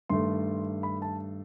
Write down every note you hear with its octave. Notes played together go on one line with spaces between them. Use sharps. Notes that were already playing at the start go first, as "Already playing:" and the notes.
G2 D#3 A3 C6
B5
A5